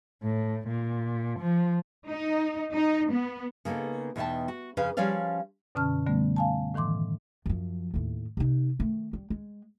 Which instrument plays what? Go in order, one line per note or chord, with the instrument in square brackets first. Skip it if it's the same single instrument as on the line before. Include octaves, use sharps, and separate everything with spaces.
[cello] A2
A#2
F3
[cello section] D#4
D#4
B3
[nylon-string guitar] C#3 A#3 B3 D#4 A4
E2 B2 D#4 E5 G5 A5
F#4
F2 C#3 G#4 B4 F5 G#5
F3 G3 C#4 C#5 D5 F5
[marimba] F#2 B2 D3 C#4 A5 F6
D3 G3 A3 B3
F5 G#5 A5
A2 D#3 E3 C6 D6
[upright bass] F#2 F3
D#2 A2
C3 D#4
D#3 A3
G3
G#3